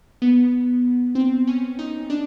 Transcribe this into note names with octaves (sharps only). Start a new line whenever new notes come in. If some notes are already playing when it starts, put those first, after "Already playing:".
B3
C4
C#4
D#4
D4